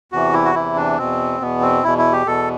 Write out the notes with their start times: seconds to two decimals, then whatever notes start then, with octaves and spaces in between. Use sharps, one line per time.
0.12 E2 C3 E3 F#4
0.33 E4
0.45 F#4
0.55 E2 C3 E3 E4
0.76 D4
0.98 E2 B2 C4
1.40 E2 B2 B3
1.62 C4
1.84 E2 B2 E4
1.98 E4
2.12 G4
2.27 E2 B2 A4